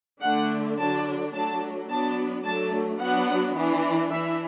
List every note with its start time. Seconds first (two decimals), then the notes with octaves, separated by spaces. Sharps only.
0.22 D3 A3 D4 F#5
0.78 D3 F#3 D4 A5
1.33 F#3 A3 D4 A5
1.90 F#3 B3 D4 A5
2.44 F#3 A3 D4 A5
3.00 F#3 B3 D4 F#5
3.56 E3 D4
4.11 E3 D4 E5